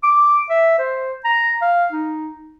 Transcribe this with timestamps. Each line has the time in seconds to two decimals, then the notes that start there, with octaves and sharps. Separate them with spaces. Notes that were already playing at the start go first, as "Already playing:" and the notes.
0.03 D6
0.50 E5
0.79 C5
1.25 A#5
1.61 F5
1.92 D#4